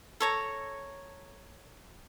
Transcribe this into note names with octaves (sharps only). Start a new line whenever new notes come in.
A4 C#5 A#5